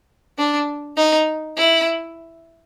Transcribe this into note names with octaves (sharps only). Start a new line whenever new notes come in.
D4
D#4
E4